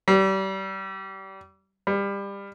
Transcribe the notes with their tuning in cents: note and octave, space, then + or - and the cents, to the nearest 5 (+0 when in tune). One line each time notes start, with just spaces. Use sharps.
G3 -30
G3 +25